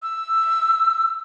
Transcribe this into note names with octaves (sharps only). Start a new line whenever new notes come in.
E6